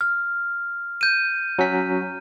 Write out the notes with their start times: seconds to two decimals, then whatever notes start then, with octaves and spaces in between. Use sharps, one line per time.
0.01 F6
1.01 G6 D#7
1.59 F#3 C#4 B6